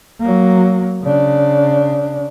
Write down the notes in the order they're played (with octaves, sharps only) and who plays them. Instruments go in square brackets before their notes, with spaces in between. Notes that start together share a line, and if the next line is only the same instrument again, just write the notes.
[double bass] F#3 A#3
C#3 D4